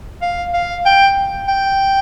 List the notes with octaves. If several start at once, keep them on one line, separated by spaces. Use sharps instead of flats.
F5
F5
G5
G5